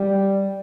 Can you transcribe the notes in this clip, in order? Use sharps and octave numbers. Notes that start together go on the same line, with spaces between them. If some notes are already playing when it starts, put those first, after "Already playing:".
Already playing: G3